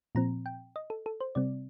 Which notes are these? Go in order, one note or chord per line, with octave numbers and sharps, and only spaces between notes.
A#2 F3 C4 A#5
G5
D#5
A4
A4
C5
C3 G3 C4 D5